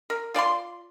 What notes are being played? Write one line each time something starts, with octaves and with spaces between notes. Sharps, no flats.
A#4
F4 D5 A5 C6